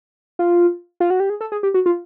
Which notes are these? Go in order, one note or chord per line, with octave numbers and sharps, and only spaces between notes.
F4
F4
F#4
G4
G#4
A4
G#4
G4
F#4
F4